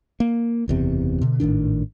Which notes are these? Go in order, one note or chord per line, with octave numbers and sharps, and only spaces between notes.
A#3
F#1 E2 C3
B2 D3
G#1 A2 D#3 D4